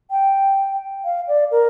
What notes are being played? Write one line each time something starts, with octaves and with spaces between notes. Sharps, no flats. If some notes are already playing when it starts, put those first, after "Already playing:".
G5
F5
D5
A#4